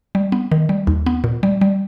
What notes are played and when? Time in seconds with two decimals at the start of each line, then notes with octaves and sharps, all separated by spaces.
0.15 G3
0.32 B3
0.52 D#3
0.69 G3
0.87 D#2
1.06 B3
1.24 A#2
1.43 G3
1.61 G3